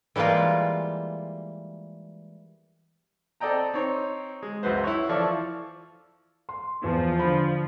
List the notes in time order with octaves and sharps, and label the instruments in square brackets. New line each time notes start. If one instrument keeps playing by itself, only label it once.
[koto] E3 G3 G#3 A#3 F4
[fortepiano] C4 A4 D5 D#5 G5 A#5
C4 D#4 C#5
G#3
C#2 F#2 F#4 B4 C5
E4 C#5
E3 F3 A4 D5 F5 C#6
[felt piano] C6
[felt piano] E2 [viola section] F3
[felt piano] D3 B5